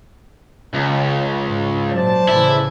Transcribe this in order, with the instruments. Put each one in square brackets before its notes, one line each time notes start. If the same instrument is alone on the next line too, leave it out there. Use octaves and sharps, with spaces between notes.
[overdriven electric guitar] C#2 [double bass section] C#3
[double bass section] G#2 C#4
[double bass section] A#2 F#3 [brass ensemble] C5 D5 A5
[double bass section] A2 C#3 E3 [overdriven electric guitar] E4